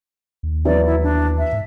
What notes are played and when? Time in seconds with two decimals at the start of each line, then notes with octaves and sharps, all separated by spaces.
0.43 D#2
0.65 E3 F#3 B3 D5
0.86 E4
1.03 D4
1.38 E5
1.53 G#2